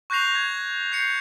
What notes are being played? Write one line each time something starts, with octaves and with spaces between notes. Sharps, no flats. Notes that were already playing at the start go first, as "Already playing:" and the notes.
C#6 F#6 G6 A#6 C7 F7
G#6
G6 C7 C#7